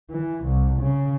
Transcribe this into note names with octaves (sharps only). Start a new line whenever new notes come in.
E3
C2
C#3